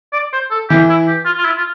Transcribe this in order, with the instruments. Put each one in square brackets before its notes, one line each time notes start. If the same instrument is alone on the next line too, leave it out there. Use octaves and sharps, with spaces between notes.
[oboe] D5
C5
A4
[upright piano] E3 [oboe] G4
[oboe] E4
G4
F4
F4
E4
F4